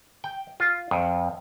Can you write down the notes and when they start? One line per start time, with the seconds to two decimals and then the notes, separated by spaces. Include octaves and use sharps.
0.24 G5
0.60 F4
0.91 F2